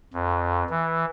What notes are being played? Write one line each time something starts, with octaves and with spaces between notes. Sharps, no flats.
F2
E3